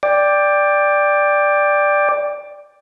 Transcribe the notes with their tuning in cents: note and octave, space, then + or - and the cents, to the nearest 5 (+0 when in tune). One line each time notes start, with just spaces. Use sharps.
D5 +0 G5 +15